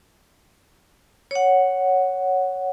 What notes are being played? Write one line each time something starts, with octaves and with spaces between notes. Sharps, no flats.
C#5 F#5